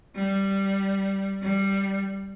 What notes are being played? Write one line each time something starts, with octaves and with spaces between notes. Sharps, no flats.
G3
G3